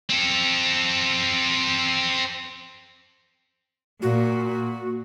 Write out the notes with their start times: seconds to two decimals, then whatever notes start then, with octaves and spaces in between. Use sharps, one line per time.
0.09 C4 A4
4.02 A#2 F#4